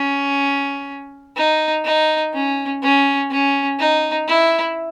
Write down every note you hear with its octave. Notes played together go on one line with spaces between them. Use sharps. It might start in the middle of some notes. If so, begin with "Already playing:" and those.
Already playing: C#4
D#4
D#4
C#4
C#4
C#4
D#4
E4